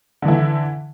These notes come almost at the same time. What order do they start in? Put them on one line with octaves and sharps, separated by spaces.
D3 E3 E4